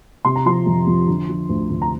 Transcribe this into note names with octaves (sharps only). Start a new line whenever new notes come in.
C3 C6
A#5
F3 C6
F2
F2
D3
F3
D2
D2
A#5